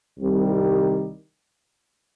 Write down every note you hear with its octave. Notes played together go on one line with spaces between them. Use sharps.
C2 C3 D#3 G3